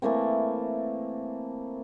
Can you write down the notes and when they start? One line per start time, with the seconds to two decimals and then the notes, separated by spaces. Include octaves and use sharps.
0.02 E3 A3 A#3 C4